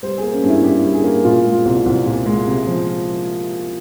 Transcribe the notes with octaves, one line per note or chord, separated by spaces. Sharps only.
G3 C5
A#3 G#4
C#4
G2 E4
G2 G4
G3
G#4
A#3
A#2 F4
G#3
C2
C2
A#2
G#3
C3
F3